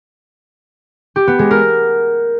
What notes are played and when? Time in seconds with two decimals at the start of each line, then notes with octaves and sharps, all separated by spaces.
1.16 G4
1.27 B3
1.39 G#3
1.51 A#4